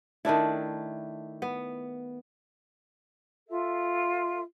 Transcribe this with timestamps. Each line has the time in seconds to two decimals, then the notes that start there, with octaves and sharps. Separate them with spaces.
0.25 D#3 A3 D4 E4
1.42 B3
3.48 F4 A4 E5